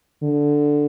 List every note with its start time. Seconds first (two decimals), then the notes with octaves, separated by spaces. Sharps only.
0.23 D3